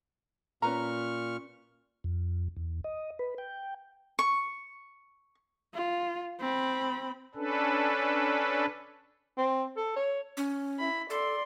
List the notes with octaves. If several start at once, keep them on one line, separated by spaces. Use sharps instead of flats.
A#2 C#4 B4 A#5 C#6 F6
F2
E2
D#5
B4
G5
C#6
F4
C4 B5
C#4 D4 A4 B4
C4
A4
C#5
C#4
E4 B5
A4 D5 C6